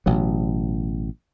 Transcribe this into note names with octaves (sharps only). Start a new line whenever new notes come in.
A1 B2 F#3